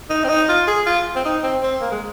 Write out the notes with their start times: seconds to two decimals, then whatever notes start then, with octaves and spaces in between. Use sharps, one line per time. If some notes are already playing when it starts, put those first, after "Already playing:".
0.10 D#4
0.24 C4
0.29 D#4
0.49 F4
0.67 G#4
0.86 F4
1.16 C4
1.25 D#4
1.43 C4
1.62 C4
1.81 A#3
1.91 G#3